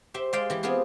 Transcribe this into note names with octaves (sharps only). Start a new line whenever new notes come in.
G4 C5 E5
G#3 G4 G#4 D5 F5 G5
E3 G4
B3 C4 F4 G4 G#4